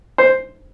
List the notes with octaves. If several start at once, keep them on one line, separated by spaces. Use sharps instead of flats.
C5